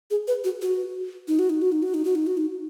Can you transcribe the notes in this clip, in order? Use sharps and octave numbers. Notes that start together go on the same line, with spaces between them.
G#4
B4
F#4
F#4
D#4
F#4
D#4
F#4
D#4
F#4
D#4
F#4
D#4
F#4
D#4